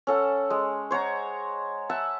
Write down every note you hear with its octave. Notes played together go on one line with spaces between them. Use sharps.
C#4 A4 F#5
G#3
C5 C#5 F#5 A#5
E5 F#5 A5